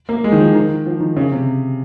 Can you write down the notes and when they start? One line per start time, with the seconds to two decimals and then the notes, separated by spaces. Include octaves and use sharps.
0.09 A#3
0.24 G#3
0.32 D#3
0.40 F3
0.54 D#3
0.86 F3
1.00 D#3
1.16 C#3
1.32 C3